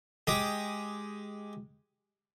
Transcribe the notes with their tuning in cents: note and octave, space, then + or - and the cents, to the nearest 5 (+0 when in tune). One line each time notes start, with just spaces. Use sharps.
G#3 +5 G4 +0 D#6 +0